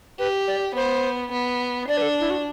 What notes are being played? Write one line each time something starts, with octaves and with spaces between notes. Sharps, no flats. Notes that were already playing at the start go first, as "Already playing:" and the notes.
G4 B4
D5
B3 C5
B3
D4 D5
B4
A4
E4
F#4